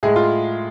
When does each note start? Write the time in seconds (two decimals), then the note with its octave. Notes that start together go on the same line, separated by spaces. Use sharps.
0.03 A2 G#3 G#4
0.16 F4